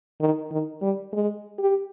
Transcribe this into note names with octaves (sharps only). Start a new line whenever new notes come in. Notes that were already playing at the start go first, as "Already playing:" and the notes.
D#3
D#3
G3
G#3
G4